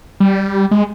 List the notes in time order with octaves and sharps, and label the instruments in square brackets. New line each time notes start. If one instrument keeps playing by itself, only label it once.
[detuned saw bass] G3
G#3